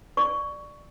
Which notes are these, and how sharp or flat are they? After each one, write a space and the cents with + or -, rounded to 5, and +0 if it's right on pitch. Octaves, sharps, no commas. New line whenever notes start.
D5 +10 C#6 +10